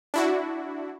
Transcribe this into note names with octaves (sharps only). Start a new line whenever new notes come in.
D4 E4 F#4